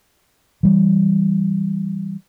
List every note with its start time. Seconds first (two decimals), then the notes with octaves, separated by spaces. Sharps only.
0.63 E3 G3